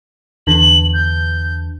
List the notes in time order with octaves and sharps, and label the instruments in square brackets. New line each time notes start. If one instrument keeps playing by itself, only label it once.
[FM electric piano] E2 D3 [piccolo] F#7
[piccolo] G6